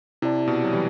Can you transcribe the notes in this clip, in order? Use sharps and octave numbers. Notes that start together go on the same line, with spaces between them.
C3 E4 G4 D5 A5
B2
F#3
E3 G3